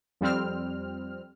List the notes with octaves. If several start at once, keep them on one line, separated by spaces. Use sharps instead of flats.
F2 G3 C4 F6